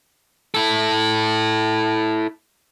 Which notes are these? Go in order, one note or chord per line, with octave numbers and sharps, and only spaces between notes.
E4 A4